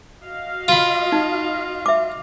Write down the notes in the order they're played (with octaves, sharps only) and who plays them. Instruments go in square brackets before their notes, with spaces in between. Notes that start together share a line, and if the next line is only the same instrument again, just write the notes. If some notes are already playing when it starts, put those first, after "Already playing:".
[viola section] F#4 D#5 F5
[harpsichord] F4 B5
[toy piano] D#4
E5 D6